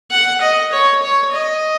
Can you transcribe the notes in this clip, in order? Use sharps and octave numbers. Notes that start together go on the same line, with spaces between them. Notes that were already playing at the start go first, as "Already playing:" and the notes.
F#5
D#5
C#5
C#5
D#5